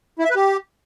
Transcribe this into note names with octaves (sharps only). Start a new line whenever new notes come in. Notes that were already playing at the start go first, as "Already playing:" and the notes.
E4
E5
B4
G4